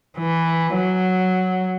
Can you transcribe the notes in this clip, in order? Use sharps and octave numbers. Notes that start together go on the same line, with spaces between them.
E3
F#3